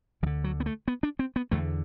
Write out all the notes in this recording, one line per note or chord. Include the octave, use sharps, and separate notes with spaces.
D2 D3 E3
F#3
B3
A3
B3
D4
C4
B3
E2 D3 A3